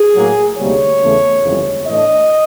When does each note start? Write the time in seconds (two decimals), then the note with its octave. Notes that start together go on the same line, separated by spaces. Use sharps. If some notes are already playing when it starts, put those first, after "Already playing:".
Already playing: G#4
0.15 A2 F#3 A#3
0.58 D2 C3 D#3 G3 A#3 C#5
1.01 E2 C#3 E3 A3
1.44 G1 F2 C#3 E3 G#3
1.87 A2 E3 A3 D4 D#5